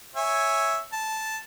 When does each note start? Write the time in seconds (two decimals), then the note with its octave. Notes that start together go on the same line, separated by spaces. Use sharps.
0.16 C#5 E5 G#5
0.93 A5